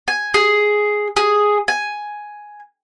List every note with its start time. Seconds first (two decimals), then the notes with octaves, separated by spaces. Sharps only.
0.08 G#5
0.34 G#4
1.17 G#4
1.68 G#5